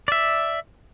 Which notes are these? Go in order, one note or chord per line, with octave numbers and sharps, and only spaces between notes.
D5 E5